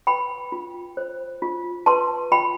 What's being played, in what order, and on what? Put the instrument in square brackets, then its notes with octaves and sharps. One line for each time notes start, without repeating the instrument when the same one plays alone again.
[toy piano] B4 G5 B5
F4
C5
F4
B4 A5 C6
F4 G5 B5